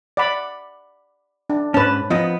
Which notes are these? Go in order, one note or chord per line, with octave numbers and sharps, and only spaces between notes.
D5 F#5 B5
D4
G#2 C#4 B4 A5
F3 B3 C4 D#5